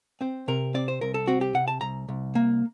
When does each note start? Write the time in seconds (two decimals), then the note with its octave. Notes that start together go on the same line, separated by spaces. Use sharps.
0.21 C4 C5
0.48 C3 A#4
0.74 C4 D5
0.88 C5
1.01 C2 A#4
1.14 A4
1.27 C4 F#4
1.41 G4
1.54 C3 F#5
1.68 A5
1.81 C2 A#5
2.09 C2
2.35 A#3